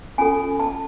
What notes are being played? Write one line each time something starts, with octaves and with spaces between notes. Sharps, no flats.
C#4 F4 A4 G#5
A5